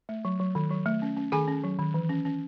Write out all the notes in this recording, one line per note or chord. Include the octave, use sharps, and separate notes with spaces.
A3
F#3
F#3
D#3
F#3
A3
C#4
C#4
D#3 G#4 G#5
C#4
F#3
D#3
E3
C#4
C#4